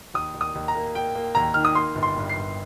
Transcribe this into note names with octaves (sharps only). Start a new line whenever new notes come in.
D#2 D#6
D#2
D#6
D#2
A#5
A#3
A#3 G5
A#3
D#2 A#5
D#3 F6
D#6
A#3 C6
G1
C6
G2
C7
G1